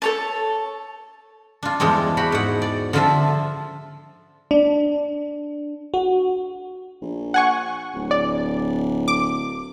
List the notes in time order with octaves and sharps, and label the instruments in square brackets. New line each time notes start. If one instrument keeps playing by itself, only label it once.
[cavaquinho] A4 C#5 A5
[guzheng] D4 F4
E2 G2 G#3 C4 D4
F#4 G4 B5
G#2 F#5
D5
D3 F3 F4 E5 A5
[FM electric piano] D4
F#4
[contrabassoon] A#1
[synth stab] F#5 G#5 C#6
[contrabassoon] D1
[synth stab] D5
D6